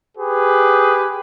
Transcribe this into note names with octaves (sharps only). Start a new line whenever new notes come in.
G4 G#4 B4